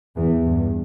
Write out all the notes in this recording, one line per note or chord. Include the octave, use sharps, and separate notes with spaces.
E2
G2